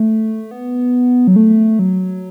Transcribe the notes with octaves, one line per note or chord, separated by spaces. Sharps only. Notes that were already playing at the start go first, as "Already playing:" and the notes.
Already playing: A3
B3
F#3
A3
F#3